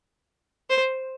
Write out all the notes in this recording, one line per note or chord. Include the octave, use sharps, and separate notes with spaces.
C5